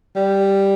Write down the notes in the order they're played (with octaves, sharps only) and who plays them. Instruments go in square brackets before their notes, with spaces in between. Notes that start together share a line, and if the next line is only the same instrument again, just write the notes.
[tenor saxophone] G3